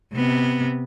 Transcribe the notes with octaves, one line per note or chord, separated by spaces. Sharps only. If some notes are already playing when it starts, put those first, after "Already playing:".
C3 B3